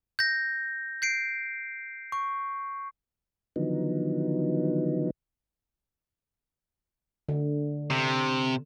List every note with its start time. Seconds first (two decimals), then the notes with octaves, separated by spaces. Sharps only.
0.19 G6 A#6
1.02 G6 C7 D7
2.12 C#6
3.56 D3 D#3 F3 F#3 B3 D#4
7.29 D3
7.90 C3